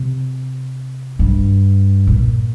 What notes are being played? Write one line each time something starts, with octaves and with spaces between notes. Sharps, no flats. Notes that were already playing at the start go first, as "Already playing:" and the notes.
Already playing: C3
G2
A#2